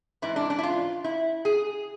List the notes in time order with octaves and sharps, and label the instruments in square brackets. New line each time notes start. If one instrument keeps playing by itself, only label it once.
[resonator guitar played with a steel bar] G#2 E3 E4
D4
D4
E4
F4
E4
G#4